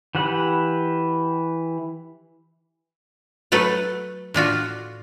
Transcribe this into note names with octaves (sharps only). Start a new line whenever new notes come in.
E3 G4 F#5 B5
F#3 A3 A4 B4
A2 D4 F4 F#4